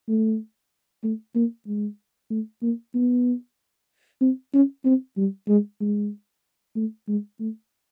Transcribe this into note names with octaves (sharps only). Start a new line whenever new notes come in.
A3
A3
A#3
G#3
A3
A#3
B3
C4
C#4
C4
G3
G#3
G#3
A3
G#3
A3